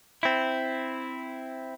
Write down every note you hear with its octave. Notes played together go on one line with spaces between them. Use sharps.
C4 E4